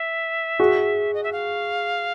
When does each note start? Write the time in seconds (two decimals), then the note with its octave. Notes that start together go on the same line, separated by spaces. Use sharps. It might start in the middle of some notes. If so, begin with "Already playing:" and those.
Already playing: E5
0.59 F#4 G#4
1.13 D#5
1.23 E5
1.32 F5